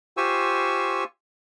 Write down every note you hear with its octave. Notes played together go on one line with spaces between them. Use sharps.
F4 G4 C5 G#5 C#6 E6